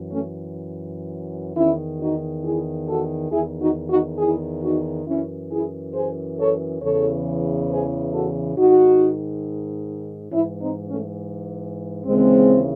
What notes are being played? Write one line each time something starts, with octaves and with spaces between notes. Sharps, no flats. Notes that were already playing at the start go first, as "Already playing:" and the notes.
Already playing: F#2 E3
A3 C#4
E2 D#3 C#4 E4
D#4 F#4
E4 G#4
F#4 A4
E2 D#3 E4 G#4
D#4 F#4
D#4 F#4
E4 G#4
D#4 F#4
F#2 E3 C#4 E4
E4 G#4
G#4 C5
A4 C#5
E2 C#3 E3 A4 C#5
G#4 C5
F#4 A4
G#2 D#3 D#4 F#4
G#2 E3 C#4 E4
C4 D#4
A3 C#4
D#2 C#3 E3 G#3 C4